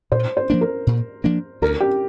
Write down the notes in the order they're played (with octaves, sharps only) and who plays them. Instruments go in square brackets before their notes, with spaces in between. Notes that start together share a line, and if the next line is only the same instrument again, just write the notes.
[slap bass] A#2 [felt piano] C5
[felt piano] C5
[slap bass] F3 A#3 D4
[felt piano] A#4
[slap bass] A#2
F3 A#3 D4
[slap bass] D2 [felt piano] A#4
[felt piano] G4